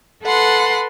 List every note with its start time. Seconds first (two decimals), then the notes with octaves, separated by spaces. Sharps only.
0.23 A4 B4 F#5 C6